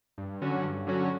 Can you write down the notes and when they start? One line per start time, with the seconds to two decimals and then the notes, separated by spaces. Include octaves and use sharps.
0.18 G2
0.41 D3 F#3 C#4 F#4
0.64 G2
0.87 D3 F#3 C#4 F#4